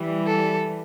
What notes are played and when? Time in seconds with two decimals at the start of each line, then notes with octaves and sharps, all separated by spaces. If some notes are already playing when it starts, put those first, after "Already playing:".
Already playing: E3 G3
0.26 A4